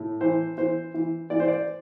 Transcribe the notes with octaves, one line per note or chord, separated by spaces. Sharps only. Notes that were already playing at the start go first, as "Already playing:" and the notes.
Already playing: A2
E3 C5
E3 C5
E3
E3 D5
C5
D5